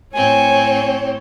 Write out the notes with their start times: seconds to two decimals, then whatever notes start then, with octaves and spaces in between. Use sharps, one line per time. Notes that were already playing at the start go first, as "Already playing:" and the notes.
0.15 A2 C4 C#5 G#5